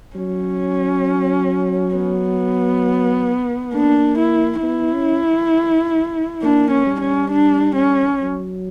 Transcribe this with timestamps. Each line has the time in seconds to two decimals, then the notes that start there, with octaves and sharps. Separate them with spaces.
0.15 F#3 C#4
1.95 B3
3.73 A#3 D4
4.18 E4
4.63 B3 E4
4.93 C#4
6.42 A#3 D4
6.71 C#4
6.87 G3
7.01 C#4
7.31 D4
7.76 C#4
8.21 F#3